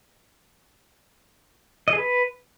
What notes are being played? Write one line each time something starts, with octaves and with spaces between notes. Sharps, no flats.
D#5
G#4
B4